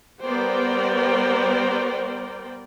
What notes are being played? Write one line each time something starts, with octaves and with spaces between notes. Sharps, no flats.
G3 B3 A#4 C5 D5 G5